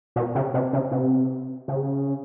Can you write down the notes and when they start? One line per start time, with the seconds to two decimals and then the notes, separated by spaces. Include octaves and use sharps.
0.16 B2
0.35 C#3
0.54 C3
0.73 C#3
0.92 C3
1.68 C#3